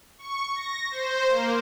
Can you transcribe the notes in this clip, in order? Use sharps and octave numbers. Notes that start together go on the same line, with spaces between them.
C#6
A#6
C5
A#3